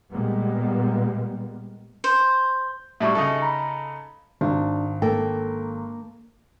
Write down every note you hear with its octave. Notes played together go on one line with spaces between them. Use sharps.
A#2 G3 G#3 A#3 B3
C5
A2 F#3 G3 E5 C#6
C#3 D#4 A4
A#5 B5
G#1 D4
A#3 A4 G5